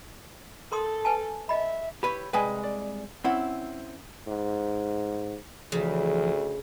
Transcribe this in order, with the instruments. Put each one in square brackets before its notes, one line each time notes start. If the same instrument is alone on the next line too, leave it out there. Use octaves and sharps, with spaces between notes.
[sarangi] A4 [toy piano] A#4 C6 D#6
[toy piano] B4 G#5 A5
[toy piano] D#5 B5 [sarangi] E5
[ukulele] E4 B5 [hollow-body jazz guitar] G4 B4 C#5
[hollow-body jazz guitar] C2 G#3 B4 [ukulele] G5 G#5
[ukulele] D5
[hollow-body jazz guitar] C4 E4 [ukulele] C#4 F#5
[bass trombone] G#2
[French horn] D2 [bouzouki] C#3 [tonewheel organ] E3 F3